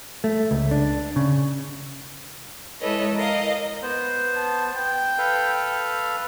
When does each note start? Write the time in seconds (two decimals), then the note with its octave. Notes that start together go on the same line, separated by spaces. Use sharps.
0.24 A3
0.51 C#2
0.71 D4
1.16 C#3
2.80 G#3 E4 A4 B4 C#5 D#5
3.14 A#4 D#5 F5
3.82 B3 C5
4.35 A5
4.76 G5
5.18 A4 B4 F5